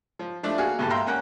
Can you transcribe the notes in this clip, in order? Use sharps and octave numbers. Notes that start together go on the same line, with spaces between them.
F3
F3 A3 D4 E4 D5
A#3 F#4 G#4 F5 G#5
G#1 G2 A#2 G3 A4 A5
E5 F5 G5 A#5 C6
A#3 C#4 A#4 F#5 G5 A#5